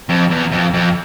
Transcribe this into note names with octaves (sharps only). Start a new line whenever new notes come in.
F2
E2
F2
F2